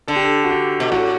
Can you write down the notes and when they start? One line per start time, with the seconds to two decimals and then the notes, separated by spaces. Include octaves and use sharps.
0.08 D3 A4
0.16 G4
0.25 A4
0.44 F#4
0.50 G4
0.80 B2
0.91 A2 F#4